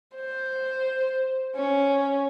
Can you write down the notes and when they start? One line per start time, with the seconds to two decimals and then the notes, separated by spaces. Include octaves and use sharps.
0.15 C5
1.55 C#4